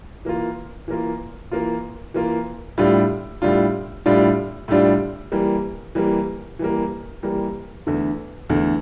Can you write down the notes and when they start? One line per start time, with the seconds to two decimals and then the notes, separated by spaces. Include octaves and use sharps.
0.25 E3 A#3 F4
0.88 E3 A#3 F4
1.52 E3 A#3 F4
2.14 E3 A#3 F4
2.78 A2 G3 D4 F4
3.42 A2 G3 D4 F4
4.06 A2 G3 D4 F4
4.68 A2 G3 D4 F4
5.32 E3 G3 A#3
5.95 E3 G3 A#3
6.59 E3 G3 A#3
7.23 E3 G3 A#3
7.87 E2 D3 A3
8.50 E2 D3 A3